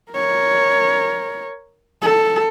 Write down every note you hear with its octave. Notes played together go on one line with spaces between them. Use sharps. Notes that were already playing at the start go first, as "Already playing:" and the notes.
A#4 C#5
A4